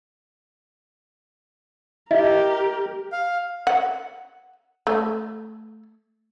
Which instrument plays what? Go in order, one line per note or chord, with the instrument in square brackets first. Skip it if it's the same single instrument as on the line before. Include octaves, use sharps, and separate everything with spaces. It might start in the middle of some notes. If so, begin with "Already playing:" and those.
[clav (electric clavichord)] E4 [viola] G4 A#4 [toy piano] D#5
[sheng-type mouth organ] F5
[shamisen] F#5
A3